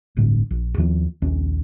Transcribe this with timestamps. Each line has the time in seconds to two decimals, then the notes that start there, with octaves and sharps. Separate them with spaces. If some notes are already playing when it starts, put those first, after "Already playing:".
0.17 D1 G1 D2 A2
0.51 A#1
0.78 D#2 F3
1.22 A#1 D#2 C#4